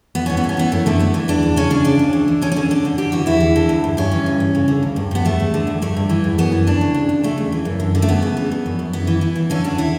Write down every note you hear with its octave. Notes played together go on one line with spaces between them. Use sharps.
E2 B3
E3 C#4
B3
G2
C#4
E3 B3
F#2 A3
D3 A3
E2 B3
E3
E2 D4
E2
C#3 C#4
C#3 D4
D2 D4
D2
E3
E3
D3 C#4
C#4
D3
D3 D4
D3
E3 G4
E3 F#4
E2 E4
E3
D3
D2
G2
G2 C#4
E3
G2
D2
C#3
D3
D2
G2
G2 B3
E2 A3
E2
D3
D2
G2 A3
G2
E3
E2
F#2 B3
E3
D2 D4
C#3
D2
D2
C#3 A3
E2
E3
F#2
D3
D3
A3
D2 B3
C#3
E3
G2
F#2
F#2
E3 B3
E3
E3
E3
D3 C#4
E2 D4
E3 E4